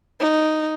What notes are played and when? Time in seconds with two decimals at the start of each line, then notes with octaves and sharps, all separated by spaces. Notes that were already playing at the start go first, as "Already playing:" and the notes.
0.20 D#4